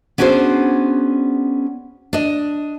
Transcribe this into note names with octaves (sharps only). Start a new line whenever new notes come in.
B3 C#4 D4 F#4 G#4 C5
D4 D#5